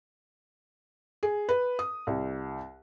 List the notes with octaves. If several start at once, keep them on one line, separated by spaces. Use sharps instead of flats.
G#4
B4
D#6
C2